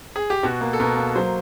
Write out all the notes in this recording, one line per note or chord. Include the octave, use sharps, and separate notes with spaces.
G#4
G4
B2 F#4
A#3
A4
B2 A#4
A#3
F#3 C5